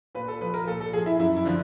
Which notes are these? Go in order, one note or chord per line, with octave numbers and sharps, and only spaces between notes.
A#2 B4
A4
F3 B4
A#4
A#2 A4
A4
F3 G#4
E4
F#2 E4
E4
D3 F3